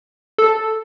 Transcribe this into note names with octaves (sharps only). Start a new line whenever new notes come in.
A4